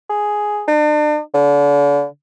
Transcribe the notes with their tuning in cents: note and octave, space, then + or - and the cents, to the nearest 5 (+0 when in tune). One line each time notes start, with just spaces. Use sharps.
G#4 +5
D4 +40
D3 -40